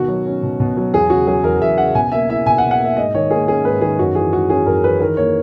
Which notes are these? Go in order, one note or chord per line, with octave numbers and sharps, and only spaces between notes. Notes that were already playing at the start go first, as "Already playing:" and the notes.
Already playing: B2 D#3 F#4
F#3
C#4
B2
B2
F#3
E2 G#4
C#3 F#4
F#3 G#4
E2 A#4
E2 E5
C#3 F#5
B2 G#5
A#3 E5
E4 E5
B2 G#5
F#5
B2
F#5
A#3 E5
G#2 D#5
D#3 C#5
A#3 G#4
C#4 G#4
G#2 B4
D#3 G#4
F#2 F#4
E3 G#4
G#3 F#4
C#4 G#4
F#2 A#4
E3 B4
D#3 A#4
A#3 C#5